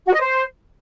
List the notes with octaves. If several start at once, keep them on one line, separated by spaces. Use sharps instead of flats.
F#4
D#5
C5